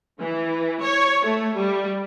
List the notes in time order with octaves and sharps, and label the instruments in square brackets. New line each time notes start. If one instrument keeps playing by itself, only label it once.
[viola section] E3
C#5
A3
G3